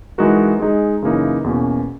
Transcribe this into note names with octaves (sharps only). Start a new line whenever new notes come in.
E3 G#3 D#4 F#4 A#4
G#3 D#4 G#4
F#2 C#3 E3 A#3 D#4
E2 B2 A#3 C#4